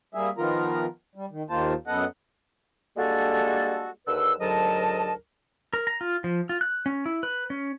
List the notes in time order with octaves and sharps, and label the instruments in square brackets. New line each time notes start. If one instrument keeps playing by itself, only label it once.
[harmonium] G3 A#3 G#4 E5
D#3 F3 B3 F4 A#4 A#5
G3
D#3
D#2 D#3 A#3 F4 C5 A5
F#2 B3 A4 D#5 F#5
[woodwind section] G3 G#3 A#3 D4 F#4 A4
D#2 D3 B4 E6
D2 G#2 F#3 A#4 D#5 A5
[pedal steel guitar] A#4
A#5
F4
F3
F4
F#6
C#4
E4
B4
C#4